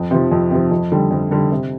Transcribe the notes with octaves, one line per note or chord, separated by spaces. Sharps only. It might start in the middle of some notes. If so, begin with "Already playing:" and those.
Already playing: F2
C3 F3
F2
C3 F3
F2
D3 G3
F2
D3 G3
C3